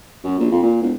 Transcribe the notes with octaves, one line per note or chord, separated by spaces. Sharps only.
F#2
A#1
F2
A#2
E1